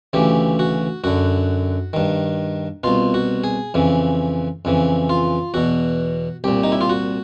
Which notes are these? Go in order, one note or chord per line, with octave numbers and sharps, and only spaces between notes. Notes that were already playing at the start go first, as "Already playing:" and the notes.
D2 C#3 E3 G4
F#4
F#2 D3 F#4
G2 D#3
C2 B2 F4
F#4
G#4
F2 C#3 E3
F2 C#3 E3
F4
E2 B2 F#4
C2 A#2 G4
D#4
E4
F4
F#4